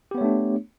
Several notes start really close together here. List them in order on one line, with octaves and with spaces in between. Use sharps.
G4 B3 C#5 A3 D4